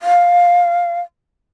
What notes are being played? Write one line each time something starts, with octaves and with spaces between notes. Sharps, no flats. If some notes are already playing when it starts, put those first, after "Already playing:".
F5